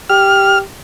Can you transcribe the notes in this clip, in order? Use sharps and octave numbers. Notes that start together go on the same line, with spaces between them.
G4 F6